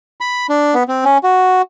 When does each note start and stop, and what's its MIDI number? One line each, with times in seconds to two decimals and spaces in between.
0.21 0.47 83
0.49 0.74 62
0.74 0.83 59
0.88 1.05 60
1.05 1.18 61
1.23 1.62 66